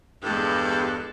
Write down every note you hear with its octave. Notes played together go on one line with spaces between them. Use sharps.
E2 G2 G#3 A4